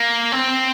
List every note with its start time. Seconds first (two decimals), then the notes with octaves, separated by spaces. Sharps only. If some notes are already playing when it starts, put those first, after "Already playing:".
Already playing: A#3
0.32 C4